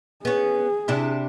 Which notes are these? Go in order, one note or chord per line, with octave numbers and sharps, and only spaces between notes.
B3 C#4 G#4
C3 D4 E4